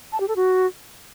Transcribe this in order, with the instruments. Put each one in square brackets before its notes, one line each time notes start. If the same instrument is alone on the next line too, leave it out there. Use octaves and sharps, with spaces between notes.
[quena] A5
G4
A4
F#4